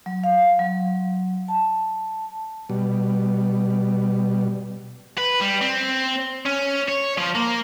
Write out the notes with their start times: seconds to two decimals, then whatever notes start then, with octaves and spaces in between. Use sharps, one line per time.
0.06 F#3
0.24 F5
0.59 F#3
1.48 A5
2.69 B2 G3
5.18 B4
5.41 G3
5.62 C4
6.46 C#4
6.88 C#5
7.18 F3
7.35 A#3